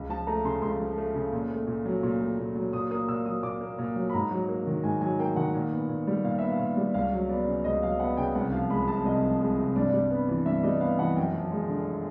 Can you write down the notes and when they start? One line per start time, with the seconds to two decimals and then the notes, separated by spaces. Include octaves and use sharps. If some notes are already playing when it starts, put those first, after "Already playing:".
Already playing: C#2
0.09 F3 A5
0.27 A3 A#5
0.44 C#3 C6
0.62 C#2 C6
0.80 F3
0.98 A3
1.15 C#3
1.32 A#2
1.50 A3
1.67 A#2
1.85 F#3
2.03 A#2
2.20 A3
2.38 A#2
2.56 F#3
2.73 A#2 D#6
2.91 A#3 D#6
3.08 A#2 E6
3.25 F#3 D#6
3.43 A#2 D6
3.61 A#3
3.79 A#2
3.96 F#3
4.10 B5
4.13 G#2 A#5
4.31 F#3
4.49 A#3
4.67 D#3
4.83 G#2 G#5
5.01 F#3 G#5
5.19 A#3 G5
5.36 D#3 F#5
5.55 A#2
5.72 B3
5.89 A#2
6.07 G3
6.24 A#2 F5
6.39 B3 E5
6.52 F5
6.59 A#2
6.77 G3
6.94 C#2 F5
7.12 F#3
7.29 B3 D5
7.48 C#3
7.64 C#2 D#5
7.82 F#3 F5
7.99 B3 F#5
8.17 C#3 G5
8.35 C2 F#5
8.52 F3 F5
8.70 G#3 B5
8.88 C3 A5
9.05 C2 D#5
9.23 F3
9.40 G#3
9.58 C3
9.76 G2 D5
9.93 G3
10.11 B3
10.29 E3
10.46 G2 E5
10.63 G3 D#5
10.81 B3 F5
10.99 E3 F#5
11.16 F#2 G5
11.33 F3
11.52 G#3
11.68 D3